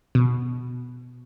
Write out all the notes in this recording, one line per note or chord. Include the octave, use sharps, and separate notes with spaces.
B2